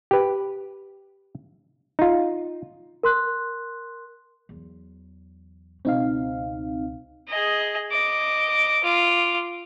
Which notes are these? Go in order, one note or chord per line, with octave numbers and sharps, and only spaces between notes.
G4 B4
D#4 F4
A#4 C6 F#6
E2 F#3
C#2 B2 C4 D#4 F5
G#4 D#5
D#5 D6
F4 D6